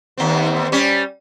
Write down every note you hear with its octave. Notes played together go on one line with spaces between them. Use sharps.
D#2 C4
G3 C#4